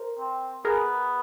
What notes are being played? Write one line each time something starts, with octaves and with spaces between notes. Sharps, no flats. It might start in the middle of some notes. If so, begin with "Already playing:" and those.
Already playing: A#4 C5
C4
B3 G#4 A#4